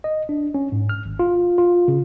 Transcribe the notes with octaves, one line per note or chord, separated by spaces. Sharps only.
D#5
D4
C#4
G#2
F6
G#1
F4
F4
C#3